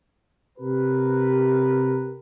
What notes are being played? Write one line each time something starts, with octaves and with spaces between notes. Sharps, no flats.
C3 G4 A#4 B4